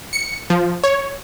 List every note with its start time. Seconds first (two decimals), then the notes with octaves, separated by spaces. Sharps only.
0.13 C#7
0.50 F3
0.84 C#5